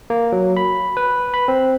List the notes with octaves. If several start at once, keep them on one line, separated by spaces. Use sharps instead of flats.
A#3
F#3
B5
B4
B5
C4